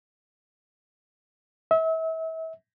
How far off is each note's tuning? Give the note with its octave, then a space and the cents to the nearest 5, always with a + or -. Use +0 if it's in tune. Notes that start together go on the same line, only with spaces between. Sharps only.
E5 -35